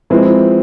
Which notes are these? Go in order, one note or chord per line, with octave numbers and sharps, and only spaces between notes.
F3 G#3 C4 E4 B4